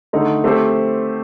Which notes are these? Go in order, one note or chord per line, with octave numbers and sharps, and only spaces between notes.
D3 A3 D#4
A3 C4 G4 C5